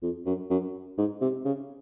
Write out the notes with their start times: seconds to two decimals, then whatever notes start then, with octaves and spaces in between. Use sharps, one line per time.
0.03 F2
0.26 F#2
0.50 F#2
0.98 G#2
1.21 C3
1.45 C#3